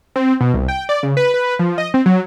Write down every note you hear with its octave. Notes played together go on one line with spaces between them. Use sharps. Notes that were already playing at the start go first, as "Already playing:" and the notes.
C4
B2
C2
G5
D5
C#3
B4
B4
F3
D#5
C4
F#3